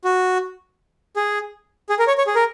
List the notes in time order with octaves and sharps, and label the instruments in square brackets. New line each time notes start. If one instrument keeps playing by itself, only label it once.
[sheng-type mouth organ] F#4
G#4
G#4
A#4
C#5
C#5
G#4
A#4